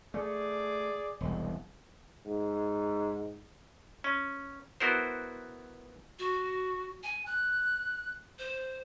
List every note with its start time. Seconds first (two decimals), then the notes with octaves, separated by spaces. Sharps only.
0.14 A3 G#4 D5
1.21 E1 C2
2.26 G#2
4.04 C#4
4.80 B3 E4 F#4 A#4 C5
6.19 F#4
7.03 G#5
7.26 F#6
8.39 C5